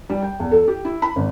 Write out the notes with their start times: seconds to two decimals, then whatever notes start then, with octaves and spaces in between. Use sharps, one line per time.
0.10 G3
0.22 G5
0.40 E2
0.51 A4
0.68 G4
0.85 E4
1.02 B5
1.16 G#1